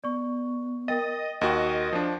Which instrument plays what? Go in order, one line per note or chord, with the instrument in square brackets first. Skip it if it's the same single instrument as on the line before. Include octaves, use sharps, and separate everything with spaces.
[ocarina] B3 [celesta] D5 C#6
[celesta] A#4 G5 A6 [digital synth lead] D#5
[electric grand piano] D#2 F#4 [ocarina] A#4 [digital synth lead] D#5 [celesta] G5
[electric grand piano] F3 D4